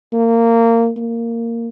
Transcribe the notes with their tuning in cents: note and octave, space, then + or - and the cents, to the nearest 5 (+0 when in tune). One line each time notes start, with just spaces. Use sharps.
A#3 -20
A#3 -10